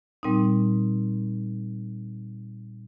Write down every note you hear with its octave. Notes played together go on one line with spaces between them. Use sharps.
A#2 G3 C4 D#4